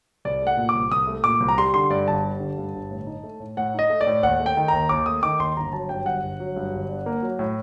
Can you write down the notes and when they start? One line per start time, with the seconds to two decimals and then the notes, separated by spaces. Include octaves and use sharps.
0.25 C2 D5
0.42 A3 F#5
0.57 A#2
0.69 D6
0.75 C2
0.91 C2 D#6
1.07 A3
1.24 A#2 D6
1.40 C2
1.49 A#5
1.58 G3 C6
1.74 D3 C6
1.90 G2 D5
2.08 G1 A5
2.24 G3
2.40 D3
2.58 G2
2.74 G1
2.91 A2
3.07 D#4
3.23 A3
3.40 A2
3.57 A2 F#5
3.74 D#4 D#5
3.90 A3
4.01 D5
4.07 A2
4.23 D#2 F#5
4.40 A3
4.46 G5
4.57 D#3
4.68 D#2 A#5
4.89 D#2 D6
5.06 A3 D#6
5.23 D#3 D6
5.39 D#2 C6
5.57 G1 A#5
5.73 F#3 A5
5.89 G2 G5
6.06 G1 F#5
6.23 G1
6.40 F#3
6.56 G2
6.73 G1
6.89 D4
7.06 A#3
7.22 F#3
7.39 A2